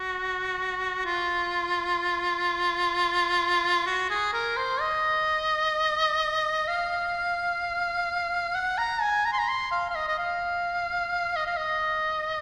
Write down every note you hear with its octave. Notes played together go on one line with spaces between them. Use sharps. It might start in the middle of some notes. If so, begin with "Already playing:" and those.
Already playing: F#4
F4
F#4
G#4
A#4
C5
D#5
F5
F#5
A#5
G#5
A#5
C6
A#5
C6
F5
F5
D#5
D#5
F5
D#5
F5
D#5